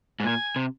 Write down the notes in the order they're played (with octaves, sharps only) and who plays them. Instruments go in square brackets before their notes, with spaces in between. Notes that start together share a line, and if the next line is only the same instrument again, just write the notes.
[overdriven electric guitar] G#2
[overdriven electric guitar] A#2 [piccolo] G#5
[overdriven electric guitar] C3